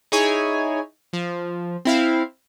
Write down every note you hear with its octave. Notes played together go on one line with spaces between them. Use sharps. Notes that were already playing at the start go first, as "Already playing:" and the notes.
D#4 E4 G#4 C#5 G#5
F3
C4 E4 F5